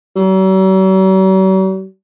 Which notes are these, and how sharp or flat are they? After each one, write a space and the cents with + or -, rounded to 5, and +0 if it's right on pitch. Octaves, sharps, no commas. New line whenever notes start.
F#3 +45